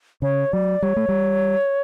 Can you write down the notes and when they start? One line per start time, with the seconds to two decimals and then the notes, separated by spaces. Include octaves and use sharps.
0.22 C#3 C#5
0.53 F#3 D5
0.83 G3 C#5
0.96 A3
1.09 G3